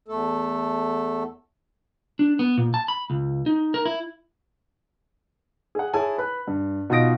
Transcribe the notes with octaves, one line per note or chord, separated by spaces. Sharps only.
E2 A3 A4
D4
B3
A#2
A5
B5
C#2
D#4
A#4
E4
G#4 F#5
E4 G#4 C#5 G#5 A5
B4 B5 F#6
G2
B2 D#4 F4 D#6 A#6 D7